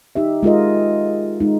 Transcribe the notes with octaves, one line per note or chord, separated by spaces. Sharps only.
D#4 G4 E5
G#3 F4 A#4 D#5
G#3 D#4